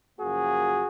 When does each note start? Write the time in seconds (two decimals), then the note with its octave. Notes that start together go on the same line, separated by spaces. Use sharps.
0.19 F#2 C#3 F3 A#3 F#4 G#4